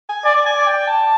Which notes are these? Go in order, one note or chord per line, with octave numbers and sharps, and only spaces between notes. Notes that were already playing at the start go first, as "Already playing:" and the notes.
G#5
D5 G#5
G#5
D5
G5
A5